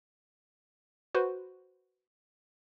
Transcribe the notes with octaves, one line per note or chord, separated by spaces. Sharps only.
F#4 B4 C5